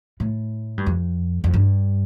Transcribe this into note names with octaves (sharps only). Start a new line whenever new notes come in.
A2
G2
F2
F2
G2